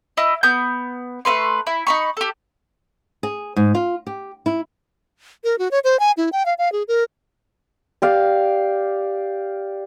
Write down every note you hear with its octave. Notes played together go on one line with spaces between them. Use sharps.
E4 D#5
B3 G6
A3 C#4 B4 C6
E4
D#4 B5 C#6
G4 A4
G#4
G#2
F4
G4
E4
A#4
F#4
C#5
C5
G#5
E4
G5
F5
F5
G#4
A#4
G4 D5 F5